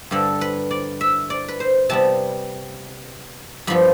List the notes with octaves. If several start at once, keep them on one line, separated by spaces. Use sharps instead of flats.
G2 D3 G3 A4
B4
D5
E5
D5
B4
C5
C3 G3 B3 A5
G2 F3 B3 B5